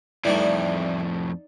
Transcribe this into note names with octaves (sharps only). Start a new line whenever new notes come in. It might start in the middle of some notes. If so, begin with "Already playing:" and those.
F2 A2 E3 G3 A3 D#4 D5